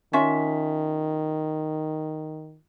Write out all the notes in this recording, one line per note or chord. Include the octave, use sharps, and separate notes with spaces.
D#3 C#4 F4 E5